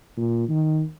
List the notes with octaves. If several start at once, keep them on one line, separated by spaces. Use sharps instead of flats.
A#2
D#3